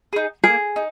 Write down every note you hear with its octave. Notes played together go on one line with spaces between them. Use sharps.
D#4 G#4
A#3 G#4
D#4